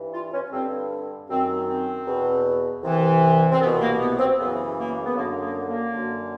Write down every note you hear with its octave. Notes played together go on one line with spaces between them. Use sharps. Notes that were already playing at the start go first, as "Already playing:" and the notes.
Already playing: G2 E3
F4
C#4
G2 D3 C4
F#2 D#3 C4
C4
E2 B2
C2 C3 E3
C4
C2 B2 B3
A#3
B3
C4
F#2 C#3 E3 B3
A#3
B3
F#2 D3 A#3
A#3
A#3
F#2 D3